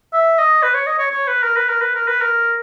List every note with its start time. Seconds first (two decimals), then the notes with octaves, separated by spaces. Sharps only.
0.13 E5
0.39 D#5
0.63 B4
0.74 C#5
0.87 D#5
0.99 C#5
1.11 C#5
1.28 B4
1.43 A#4
1.57 B4
1.70 A#4
1.82 B4
1.95 A#4
2.08 B4
2.21 A#4